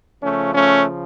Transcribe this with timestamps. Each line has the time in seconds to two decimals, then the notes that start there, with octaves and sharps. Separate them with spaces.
0.21 C#3 F3 A3 C#4
0.54 A3 C#4